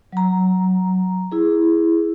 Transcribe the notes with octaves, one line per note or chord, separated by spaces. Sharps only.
F#3 A#5
E4 G#4